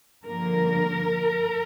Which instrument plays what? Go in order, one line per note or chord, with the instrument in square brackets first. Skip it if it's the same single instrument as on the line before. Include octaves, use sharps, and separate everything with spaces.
[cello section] G2 D3 F3 A#3 A#4